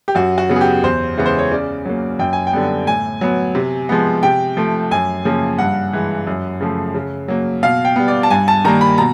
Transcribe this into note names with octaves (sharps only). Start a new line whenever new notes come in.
G4
F#2 F#4
F#4
C#3 F#3 B3
G#4
G4
E2 C5
C#3 E3 G#3 B3
C5
C#5
C#3 D5
F#3 A#3
F#2 G5
G#5
G5
D3 G3 B3
A2 G#5
F#3 B3
C3
F3 G#3 B3
C3 G5
F3 A3
F#2 G#5
C#3 F3 A#3
G2 F#5
E3 G#3
F#2
C#3 F3 A3
C#3
F#3 A#3
B2 F5
G5
G3 B3
D5
A5
G2 G#5
A5
D#3 G3 A#3 A#5
B5
B2 A#5